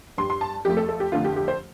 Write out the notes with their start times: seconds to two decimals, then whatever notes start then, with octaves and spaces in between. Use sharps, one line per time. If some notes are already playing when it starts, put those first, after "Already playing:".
0.18 G2 G3 C6
0.30 C6
0.41 A5
0.65 F2 F3 A3 G4
0.77 A4
0.89 A4
1.00 G4
1.12 F2 D3 F3 A3 F4
1.24 G4
1.36 G4
1.48 C5